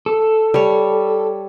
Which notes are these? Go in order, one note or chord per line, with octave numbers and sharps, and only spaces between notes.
A4
G3 C#5